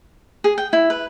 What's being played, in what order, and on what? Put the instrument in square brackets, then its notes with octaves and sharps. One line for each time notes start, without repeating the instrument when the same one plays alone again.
[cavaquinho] G#4
G5
E4
B4